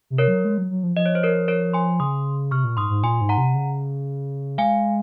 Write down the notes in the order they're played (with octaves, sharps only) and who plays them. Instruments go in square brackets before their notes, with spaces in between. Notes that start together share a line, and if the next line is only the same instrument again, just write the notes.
[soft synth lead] C3
[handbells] A#4 C#5
[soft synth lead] F#3
G#3
F#3
F#3
F3
[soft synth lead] F3 [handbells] D#5
[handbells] C#5
C5
A#4 C#5
A#4 C#5
G#5 C6
[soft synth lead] C#3 [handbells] C6 D#6
[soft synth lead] C3 [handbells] C#6 F6
[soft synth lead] A#2
[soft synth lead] G#2 [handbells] C6 D#6
[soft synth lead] G#2
[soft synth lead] A#2 [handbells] G#5 C6
[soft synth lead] G#2
[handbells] F#5 A#5
[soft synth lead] C3
C#3
[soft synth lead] G#3 [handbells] F5 G#5